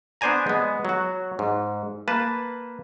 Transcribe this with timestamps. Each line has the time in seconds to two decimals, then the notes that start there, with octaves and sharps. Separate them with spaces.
0.21 B3 D4 C5 D5 G#5 A#5
0.47 G#3 B3
0.85 F#3 F#4
1.39 G#2
2.08 A#3 B4 A5